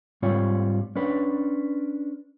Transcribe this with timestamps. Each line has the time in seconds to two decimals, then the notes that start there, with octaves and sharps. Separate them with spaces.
0.22 G#2 G3 C4 F4 C#5
0.96 C#4 D4 B4